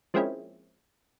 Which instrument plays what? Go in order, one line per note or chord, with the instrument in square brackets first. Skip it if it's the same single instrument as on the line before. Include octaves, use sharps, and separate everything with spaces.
[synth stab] F3 G#3 A#3 C4 C#4 E4